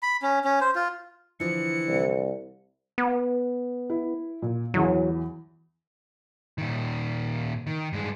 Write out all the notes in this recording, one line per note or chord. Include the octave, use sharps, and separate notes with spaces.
B5
C#4
C#4
C5
F4
D3 E3 F3 C#7
C2
B3
E4
A#2
E2 E3 F#3
A#2 D#3
D#3
G2 G#3